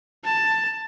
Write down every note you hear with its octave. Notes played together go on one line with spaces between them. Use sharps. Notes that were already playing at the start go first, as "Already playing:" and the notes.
A5